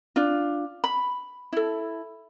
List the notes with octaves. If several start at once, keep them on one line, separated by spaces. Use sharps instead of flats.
D4 F4
B5
E4 A4